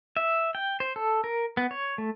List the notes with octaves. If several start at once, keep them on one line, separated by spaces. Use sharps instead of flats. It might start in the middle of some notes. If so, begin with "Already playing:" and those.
E5
G5
C5
A4
A#4
B3
C#5
A3